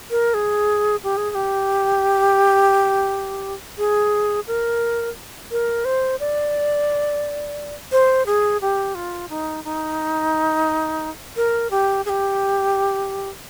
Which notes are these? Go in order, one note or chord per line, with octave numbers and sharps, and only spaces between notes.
A#4
G#4
G4
G#4
G#4
G4
G#4
A#4
A#4
C5
D5
C5
G#4
G4
F4
D#4
D#4
A#4
G4
G#4
G4